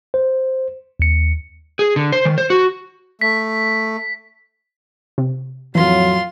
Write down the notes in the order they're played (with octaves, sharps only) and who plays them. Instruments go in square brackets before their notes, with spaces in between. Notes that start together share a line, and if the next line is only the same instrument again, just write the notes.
[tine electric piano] C5
D#2 C#7
[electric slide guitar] G#4
D3
C5
D#3
C5
F#4
[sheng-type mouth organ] A3 [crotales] B6
[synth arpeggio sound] C3
[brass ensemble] F2 A2 F#3 [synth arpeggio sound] E3 [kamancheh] F4 C6